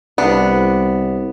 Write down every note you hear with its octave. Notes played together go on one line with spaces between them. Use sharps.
C2 B3 D4